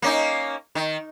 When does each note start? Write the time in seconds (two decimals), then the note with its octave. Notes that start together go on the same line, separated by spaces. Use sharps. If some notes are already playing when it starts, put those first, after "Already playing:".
0.02 A#3 C#4 D#4
0.75 D#3